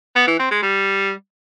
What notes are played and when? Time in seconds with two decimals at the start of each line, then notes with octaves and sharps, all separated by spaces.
0.16 B3
0.27 E3
0.39 C4
0.51 G#3
0.62 G3